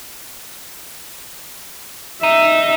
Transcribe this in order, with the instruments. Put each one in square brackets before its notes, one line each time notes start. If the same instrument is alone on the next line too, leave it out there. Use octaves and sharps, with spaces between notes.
[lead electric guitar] D#4 [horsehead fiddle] E5